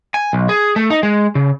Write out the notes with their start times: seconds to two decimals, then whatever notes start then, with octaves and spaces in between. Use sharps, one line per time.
0.14 G#5
0.33 B1
0.49 G#4
0.76 A3
0.90 D#4
1.03 G#3
1.35 C#3